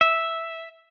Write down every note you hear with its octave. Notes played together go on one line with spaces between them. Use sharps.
E5